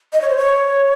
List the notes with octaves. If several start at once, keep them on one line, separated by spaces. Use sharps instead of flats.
D#5
C#5
C5
C#5